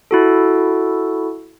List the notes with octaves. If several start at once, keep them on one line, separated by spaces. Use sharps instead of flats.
E4 F#4 A4